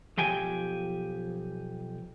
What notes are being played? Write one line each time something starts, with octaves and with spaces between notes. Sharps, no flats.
B1 F3 G4 G5 G#5